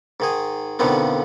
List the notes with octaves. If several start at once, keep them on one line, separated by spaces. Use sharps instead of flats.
G#2 D#3 G#4
F2 B2 D3 D#3 F3 B3